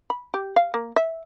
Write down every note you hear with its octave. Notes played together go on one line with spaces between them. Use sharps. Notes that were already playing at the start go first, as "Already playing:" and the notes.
B5
G4
F5
A#3
E5